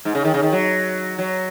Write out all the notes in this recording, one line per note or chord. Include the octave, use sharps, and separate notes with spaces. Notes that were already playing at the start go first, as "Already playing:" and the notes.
G#2
C#3
D#3
C#3
D#3
F#3
F#3